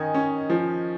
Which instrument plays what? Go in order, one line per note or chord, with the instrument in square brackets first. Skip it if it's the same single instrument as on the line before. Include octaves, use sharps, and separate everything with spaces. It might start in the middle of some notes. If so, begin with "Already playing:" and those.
Already playing: [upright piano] D#3 C#4 [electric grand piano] D#5 G#5
[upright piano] C#4
F3